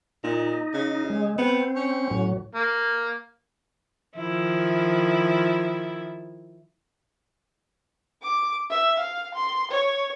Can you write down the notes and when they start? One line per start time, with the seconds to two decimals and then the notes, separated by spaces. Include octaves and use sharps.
0.24 A#2 D#4
0.74 C#3
1.10 G#3
1.38 B3 C4
1.76 C#4
2.11 A2 F#3
2.55 A#3
4.16 D#3 F3 E4
8.23 D6
8.70 E5
8.99 F5
9.34 C6
9.71 C#5